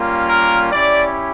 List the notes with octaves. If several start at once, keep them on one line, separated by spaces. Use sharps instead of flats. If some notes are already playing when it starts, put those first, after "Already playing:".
Already playing: G3 A#3 C#4 F4
A#4
C#4 E4 G4 D5